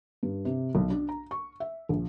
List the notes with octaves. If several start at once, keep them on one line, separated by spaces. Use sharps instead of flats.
G2
C3
B1
D4
A#5
C#6
E5
A#1